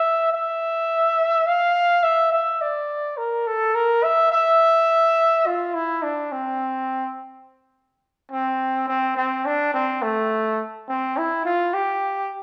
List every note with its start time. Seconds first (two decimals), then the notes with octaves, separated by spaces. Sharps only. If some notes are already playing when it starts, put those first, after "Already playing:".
Already playing: E5
0.32 E5
1.46 F5
2.03 E5
2.32 E5
2.61 D5
3.17 A#4
3.47 A4
3.75 A#4
4.03 E5
4.32 E5
5.46 F4
5.74 E4
6.02 D4
6.32 C4
8.31 C4
8.88 C4
9.16 C4
9.45 D4
9.74 C4
10.02 A3
10.89 C4
11.17 E4
11.45 F4
11.74 G4